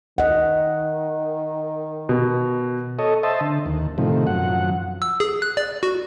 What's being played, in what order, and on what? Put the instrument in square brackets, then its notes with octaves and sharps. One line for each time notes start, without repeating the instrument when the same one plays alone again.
[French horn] D#3 [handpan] D#5 F#5
[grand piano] B2
[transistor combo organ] A4 C#5 D#5
C5 D#5 E5 A5
D3
D#2
A2 C3 D#3 F3
F#2 F3 F#5
[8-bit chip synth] E6
G#4
F#6
D5
F#4